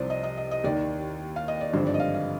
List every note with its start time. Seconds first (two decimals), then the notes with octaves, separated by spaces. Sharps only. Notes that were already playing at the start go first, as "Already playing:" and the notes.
Already playing: C2 C3 F3 C5 D5
0.10 D#5
0.23 D#5
0.37 D#5
0.51 D#5
0.64 D#2 D#3 D5
1.36 F5
1.48 D#5
1.61 D5
1.73 G#1 G2 D3 F3 C5
1.87 D5
1.94 D#5
2.00 F5
2.14 F5